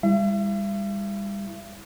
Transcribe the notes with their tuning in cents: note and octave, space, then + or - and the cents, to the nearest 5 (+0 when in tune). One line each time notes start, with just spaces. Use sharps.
G3 +35 E4 +0 E5 +45